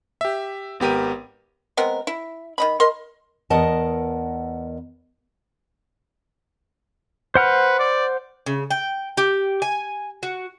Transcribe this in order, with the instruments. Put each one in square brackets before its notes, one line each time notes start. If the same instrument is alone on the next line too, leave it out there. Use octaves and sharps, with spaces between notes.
[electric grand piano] G4 E5
G#1 B3 G4 A#4 D#7
[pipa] G#3 B3 C4 A#4
E4
D#3 D#5 B5
A#4 D#5 C6
[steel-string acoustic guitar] E2 B3 A#4 D#5 F#5 A5
[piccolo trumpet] B4 [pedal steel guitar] C5 F#5 F6
[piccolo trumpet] D5
[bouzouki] C#3
G5
G4
G#5
F#4